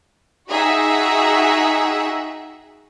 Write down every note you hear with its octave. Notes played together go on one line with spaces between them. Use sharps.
D#4 F#4 G#4 E5 F#5 G5